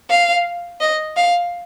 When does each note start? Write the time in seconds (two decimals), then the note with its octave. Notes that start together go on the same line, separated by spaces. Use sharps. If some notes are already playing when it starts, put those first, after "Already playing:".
0.10 F5
0.81 D#5
1.17 F5